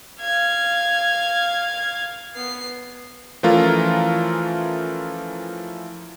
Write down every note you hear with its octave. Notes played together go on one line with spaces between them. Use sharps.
F5 G#6
B3 C7
E3 F3 A3 C#4 F4 A#4